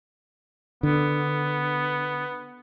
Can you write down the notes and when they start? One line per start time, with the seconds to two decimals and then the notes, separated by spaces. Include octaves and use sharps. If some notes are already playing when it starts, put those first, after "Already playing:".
0.83 D3 B3